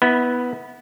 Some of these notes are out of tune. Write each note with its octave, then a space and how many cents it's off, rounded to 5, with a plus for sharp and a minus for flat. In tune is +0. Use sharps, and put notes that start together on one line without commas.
B3 +0 E4 -30